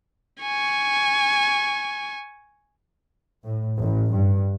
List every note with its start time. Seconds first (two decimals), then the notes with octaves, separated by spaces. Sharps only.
0.41 G#5 C#6
3.45 A2
3.79 A1
4.12 G2